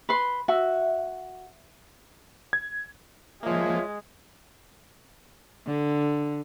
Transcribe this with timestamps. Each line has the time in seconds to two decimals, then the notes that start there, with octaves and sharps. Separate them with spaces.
0.09 B4 B5 C6
0.48 F#4 E5
2.53 G#6
3.43 F3 G#3 A#3 F4 C#5 E5
5.67 D3